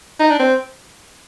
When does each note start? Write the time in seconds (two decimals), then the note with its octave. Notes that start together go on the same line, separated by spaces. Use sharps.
0.20 D#4
0.30 D4
0.40 C4